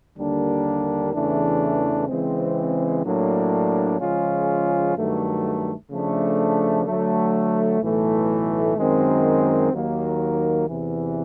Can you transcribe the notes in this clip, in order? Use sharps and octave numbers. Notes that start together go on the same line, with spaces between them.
D#2 D3 G3 A#3 D4
E2 C#3 E3 A3 D4
C#3 E3 G#3 C4
A2 F#3 A#3 D4
C#3 F3 G#3 C#4 F4
G2 D#3 F#3 A3
C#3 F3 A3 D4
D3 F#3 A3
B1 A2 E3 A3
F#2 D#3 G#3 C4
D#2 D#3 F#3 A#3
E2 C3 E3